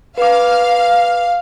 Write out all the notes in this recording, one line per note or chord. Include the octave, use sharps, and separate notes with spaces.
B4 F5 D6